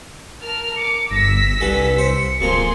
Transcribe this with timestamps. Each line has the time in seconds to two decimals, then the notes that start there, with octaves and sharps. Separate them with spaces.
0.42 A#4 A5 F6
0.76 D6 C#7
1.11 G1 E6 A#6 B6
1.61 C2 G2 A4 F#5 G#5
1.98 C5 C#7
2.40 D1 F2 A#2 G#4 A#5 C6